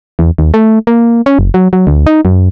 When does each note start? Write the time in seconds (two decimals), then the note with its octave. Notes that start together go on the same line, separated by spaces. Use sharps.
0.19 E2
0.38 D#2
0.54 A3
0.87 A#3
1.26 C#4
1.39 F#1
1.54 F#3
1.73 F#3
1.87 D2
2.06 D#4
2.25 F#2